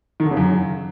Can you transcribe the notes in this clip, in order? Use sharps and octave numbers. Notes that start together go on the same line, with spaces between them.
D#3
D3
C#3
F#2